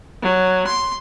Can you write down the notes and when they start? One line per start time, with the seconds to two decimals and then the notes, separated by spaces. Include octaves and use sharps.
0.21 F#3
0.67 C6